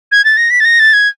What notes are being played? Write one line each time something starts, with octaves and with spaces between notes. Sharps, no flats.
G#6
A6
A#6
B6
A6
A#6
A6
G#6